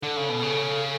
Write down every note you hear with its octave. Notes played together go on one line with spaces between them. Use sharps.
D3 A4
C#3
B2
C#3